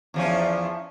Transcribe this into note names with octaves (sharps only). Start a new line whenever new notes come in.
E2 F3 C#4